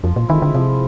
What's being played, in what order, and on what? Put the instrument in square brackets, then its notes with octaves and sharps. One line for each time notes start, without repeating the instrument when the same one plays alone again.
[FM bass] F2 [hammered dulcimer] F3
[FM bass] A#2
[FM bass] D#3 [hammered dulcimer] G#3 C4 E4
[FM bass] D3
[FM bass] C3 [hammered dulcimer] F3